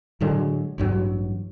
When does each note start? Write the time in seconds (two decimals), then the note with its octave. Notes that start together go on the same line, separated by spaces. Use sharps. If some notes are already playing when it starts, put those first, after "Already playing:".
0.21 A2 D3 F#3 G#3
0.78 A1 G2 F#3